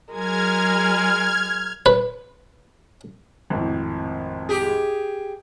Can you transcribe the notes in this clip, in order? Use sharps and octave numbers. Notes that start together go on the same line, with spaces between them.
F#3 G#3 G#4 A#4 F6 G#6
B4
G#1 F2 A2
G4 G#4